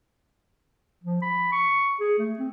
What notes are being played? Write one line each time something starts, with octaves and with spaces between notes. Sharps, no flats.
F3
B5
C#6
G#4
A3
C4